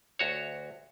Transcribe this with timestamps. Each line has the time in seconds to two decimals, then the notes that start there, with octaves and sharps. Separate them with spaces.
0.19 D2 F#4 C#5